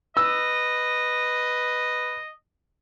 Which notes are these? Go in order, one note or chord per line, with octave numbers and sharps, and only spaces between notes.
B4 D#5 E6